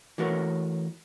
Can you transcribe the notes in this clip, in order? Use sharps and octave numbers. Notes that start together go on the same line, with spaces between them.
E3 A3 F#4 A#4 C#5